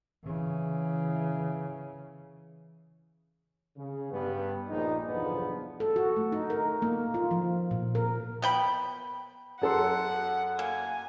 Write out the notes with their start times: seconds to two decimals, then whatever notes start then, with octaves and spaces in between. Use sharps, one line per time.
0.24 C#3 E3
3.77 C#3
4.12 G2 B3
4.69 A#1 D#4
5.08 B1 E2 G2 D3 F3 B3
5.80 A4
5.96 F#4
6.17 A3
6.32 D#4
6.50 A#4
6.82 A#3
7.14 F4
7.31 F3
7.71 A#2
7.95 A#4
8.42 B3 G5 B5
9.61 F#2 A4 F#5 C6
10.59 A#3 G#5